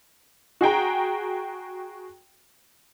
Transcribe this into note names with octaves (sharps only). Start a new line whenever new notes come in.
F#4 G#4 G5 A#5